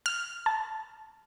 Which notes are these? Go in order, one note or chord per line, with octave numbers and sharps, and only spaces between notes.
F6
A5